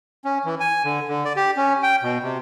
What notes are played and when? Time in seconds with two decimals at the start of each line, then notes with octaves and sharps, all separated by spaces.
0.25 C#4
0.45 E3
0.60 G#5
0.85 D3
1.08 D3
1.25 D5
1.36 G4
1.57 C#4
1.83 G5
2.03 B2
2.23 C3